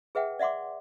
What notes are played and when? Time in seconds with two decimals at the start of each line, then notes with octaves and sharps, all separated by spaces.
0.15 G#4 B4 E5 F#5 G5
0.39 D5 E5 F#5 C6 D6